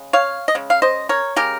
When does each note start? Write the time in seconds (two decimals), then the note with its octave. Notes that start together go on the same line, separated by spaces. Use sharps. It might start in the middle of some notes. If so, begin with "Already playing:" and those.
Already playing: C#3 G#3
0.13 C#5 F5
0.48 D#5
0.55 C#3 G#3
0.70 F5
0.82 C5 D#5
1.09 A#4 C#5
1.36 C#3 G#3 G4 A#4